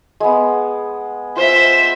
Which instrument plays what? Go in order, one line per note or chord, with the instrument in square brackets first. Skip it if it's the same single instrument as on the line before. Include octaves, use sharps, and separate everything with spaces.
[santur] G#3 B3
[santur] F4 [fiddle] C5 E5